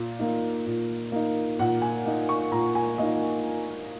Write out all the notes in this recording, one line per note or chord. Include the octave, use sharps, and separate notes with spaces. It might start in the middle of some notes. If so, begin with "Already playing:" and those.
Already playing: A#2
A#3 D#4
A#2
A#3 D#4
A#2 F#5
G#5
A#3 D#4
C#6
A#2 A#5
G#5
A#3 D#4 D#5